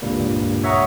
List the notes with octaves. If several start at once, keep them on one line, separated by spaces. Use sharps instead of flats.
C#2 G2 A#2 G3 A#3
C#5 E5 F#5 A#5 C#6 D#6